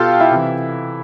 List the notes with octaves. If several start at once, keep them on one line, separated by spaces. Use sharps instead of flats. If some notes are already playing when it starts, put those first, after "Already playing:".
Already playing: B2 F4 G4 A4 F5 G5 A5
E4 E5
C3 E3